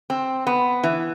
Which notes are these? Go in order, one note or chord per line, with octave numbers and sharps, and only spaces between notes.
C4
B3
E3